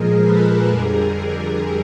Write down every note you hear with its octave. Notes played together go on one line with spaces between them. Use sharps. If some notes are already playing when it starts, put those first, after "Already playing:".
Already playing: A#2 F3 G#3 G#4 A#4
A4 B4
F2 D3 G3 G#4 A#4